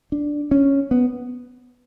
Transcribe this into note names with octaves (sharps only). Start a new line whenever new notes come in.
D4
C#4
B3